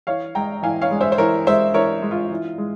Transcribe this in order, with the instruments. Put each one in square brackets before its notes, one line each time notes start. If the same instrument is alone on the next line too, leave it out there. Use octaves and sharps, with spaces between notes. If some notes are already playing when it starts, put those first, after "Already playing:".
[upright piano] E3 C#5 F5
G#3 G5 A#5
E3 F5 G#5
C#5 F5
G#3
C5 E5
C5
E3 A#4 C#5
G#3 C5 E5
E3 A#4 C#5
G#3
F4
E3
G#3